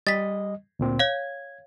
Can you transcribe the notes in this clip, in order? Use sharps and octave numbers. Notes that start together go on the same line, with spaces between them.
G3 D#5 A6 B6
D2 A#2 C4
C#5 F5 G#6